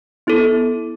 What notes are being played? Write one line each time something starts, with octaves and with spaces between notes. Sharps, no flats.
B3 E4 A4